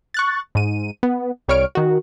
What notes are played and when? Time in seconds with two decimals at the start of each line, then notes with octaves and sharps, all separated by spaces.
0.14 C#6 F#6 A6
0.55 G#2 D#7
1.03 B3
1.48 C2 G3 C#5 C#6 F6 D7
1.75 D#3 F#4